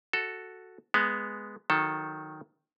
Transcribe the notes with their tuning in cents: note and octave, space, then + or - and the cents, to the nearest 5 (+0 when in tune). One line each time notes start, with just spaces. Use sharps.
F#4 +0 A4 +0
G#3 +0 B3 +0
D#3 +0 F#3 -20 A4 +0